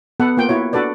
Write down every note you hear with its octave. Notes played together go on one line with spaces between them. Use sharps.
B3 A4 B4 F#5
A#3 F4 G5
E4 F#4 C#5
D4 F#4 A4 B4 D5